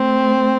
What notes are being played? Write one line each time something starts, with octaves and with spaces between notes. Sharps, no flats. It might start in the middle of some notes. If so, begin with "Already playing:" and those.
Already playing: A3 C4